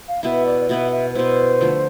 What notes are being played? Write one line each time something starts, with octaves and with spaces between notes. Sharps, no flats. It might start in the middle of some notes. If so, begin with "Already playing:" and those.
F5
B2 B3 E4 E5
D5
D5
B2 B3 E4 E5
E5
B4
B2 B3 E4 C5
D3 F3 A3